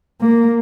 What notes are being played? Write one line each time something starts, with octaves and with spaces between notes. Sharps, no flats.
A#3